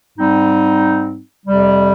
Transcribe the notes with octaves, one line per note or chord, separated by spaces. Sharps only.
G#2 G3 C4 D#4
F2 C3 G3